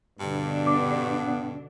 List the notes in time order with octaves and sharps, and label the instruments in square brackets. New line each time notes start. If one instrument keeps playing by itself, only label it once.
[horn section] G2 [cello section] B2 D3 D4
[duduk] B3 [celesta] D6